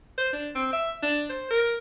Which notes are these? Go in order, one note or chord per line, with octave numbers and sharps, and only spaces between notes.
C5
D4
C4
E5
D4
C5
A#4